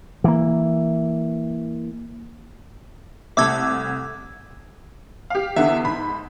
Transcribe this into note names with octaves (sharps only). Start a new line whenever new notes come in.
E3 A#3
C2 C3 A3 A4 E5 D6 E6 G#6
G4 F5
E2 D3 E5 F#5
G#2 B5